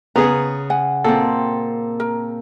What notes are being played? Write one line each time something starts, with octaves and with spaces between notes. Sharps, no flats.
C#3 B3 G#4 A#5
F#5 G#5
A#2 C4 A4
A#4